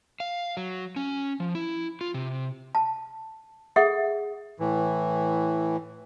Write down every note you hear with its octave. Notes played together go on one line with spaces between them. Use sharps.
F5
F#3
C#4
F3
E4
F4
C3
A5
G#4 A4 E5 F#5
A2 E3